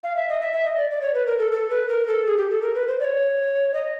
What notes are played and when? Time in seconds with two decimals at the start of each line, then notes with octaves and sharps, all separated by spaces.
0.03 F5
0.16 E5
0.29 D#5
0.41 E5
0.53 E5
0.65 D#5
0.77 D5
0.91 D5
1.02 C#5
1.14 B4
1.27 A#4
1.39 A4
1.52 A4
1.70 B4
1.89 A#4
2.07 A4
2.26 G#4
2.37 G4
2.50 A4
2.62 A#4
2.75 B4
2.88 C5
3.00 D5
3.04 C#5
3.74 D#5